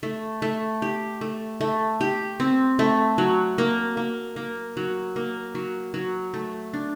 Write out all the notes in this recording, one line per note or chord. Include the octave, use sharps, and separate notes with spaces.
A3
A3
G4
A3
A3
G4
C4
A3
F#3
A#3
A#3
A#3
F#3
A#3
F#3
F#3
A3
D4